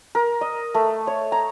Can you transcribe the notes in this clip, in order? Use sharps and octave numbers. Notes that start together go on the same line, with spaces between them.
A#4
D#5
A3
C#5
A#5